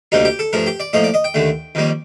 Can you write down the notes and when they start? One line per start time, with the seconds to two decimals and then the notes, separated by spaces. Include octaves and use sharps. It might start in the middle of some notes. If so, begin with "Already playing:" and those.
0.12 D2 C3 G3 A#3 D#4
0.25 G4
0.39 A4
0.53 G2 F3 A3 A#4
0.66 G4
0.80 D5
0.93 A2 F3 A#3 D#5
1.04 D5
1.14 D#5
1.24 G5
1.34 D#2 D3 A3
1.75 F2 D#3 G3 A#3